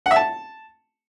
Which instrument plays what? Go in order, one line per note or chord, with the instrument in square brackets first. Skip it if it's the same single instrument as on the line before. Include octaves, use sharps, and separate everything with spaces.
[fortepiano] F#5
E5
A5